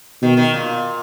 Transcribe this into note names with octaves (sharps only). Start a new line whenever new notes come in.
B2 D#3
D#3
A#2